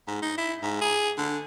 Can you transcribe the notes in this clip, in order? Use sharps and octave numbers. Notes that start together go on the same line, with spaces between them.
G#2
D#4
E4
G#2
G#4
D3